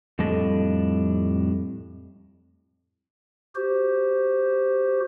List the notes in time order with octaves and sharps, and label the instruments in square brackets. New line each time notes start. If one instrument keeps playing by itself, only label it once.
[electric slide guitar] F2 A2 G3 D4 A4 D#5
[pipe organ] F#4 G4 C5